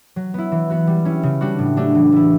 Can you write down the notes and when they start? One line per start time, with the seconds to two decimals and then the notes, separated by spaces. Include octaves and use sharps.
0.16 F#3
0.34 B3 E4
0.52 E3
0.70 B3 F#4
0.87 G3
1.05 C#4 E4
1.23 C#3
1.41 G3 D4 F#4
1.59 A2
1.76 F#3 A3 D4 G4
1.95 E3
2.12 A3 E4